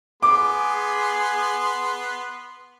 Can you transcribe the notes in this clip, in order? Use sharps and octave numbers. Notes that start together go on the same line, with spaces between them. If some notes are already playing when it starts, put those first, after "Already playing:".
B3 G#4 C6 D6